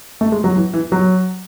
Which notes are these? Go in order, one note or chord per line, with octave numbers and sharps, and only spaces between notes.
A3
G#3
F#3
E3
E3
F#3